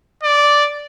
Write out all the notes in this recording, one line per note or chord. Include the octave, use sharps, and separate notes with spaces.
D5